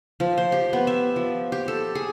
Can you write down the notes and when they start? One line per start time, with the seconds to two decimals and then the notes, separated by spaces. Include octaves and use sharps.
0.20 F3
0.38 C5
0.52 G4
0.73 B3
0.87 E5
1.16 F3
1.52 G4
1.68 A4
1.95 G#4